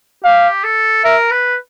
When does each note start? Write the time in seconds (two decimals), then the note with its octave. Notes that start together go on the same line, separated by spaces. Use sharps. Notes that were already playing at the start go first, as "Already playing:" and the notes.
0.24 G4 F5
0.64 A4
1.04 A#4 E5
1.31 B4